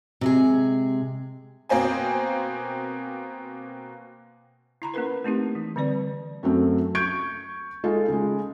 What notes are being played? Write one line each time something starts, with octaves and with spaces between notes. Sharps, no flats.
C3 G#3 G#4
B2 A#3 C4 C5 G#5
E4 A#5 B5
A#3 C#4 E4 A#4 B4
A3 C4 D#4 G4
E3
D3 G3 C4 B4 D5
F#2 F#3 A3 C4
C#6 G6 G#6 D7
G#3 D#4 F4 A4
C#3 G#3